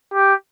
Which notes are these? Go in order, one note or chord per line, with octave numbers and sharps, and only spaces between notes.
G4